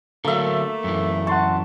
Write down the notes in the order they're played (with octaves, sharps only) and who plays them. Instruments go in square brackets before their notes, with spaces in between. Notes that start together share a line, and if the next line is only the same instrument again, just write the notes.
[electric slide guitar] D3 F#3 [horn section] A3 [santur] A#3 E5 [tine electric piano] A4 A#4
[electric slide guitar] F#2 E3
[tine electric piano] F#5 C6 C#6 [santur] A5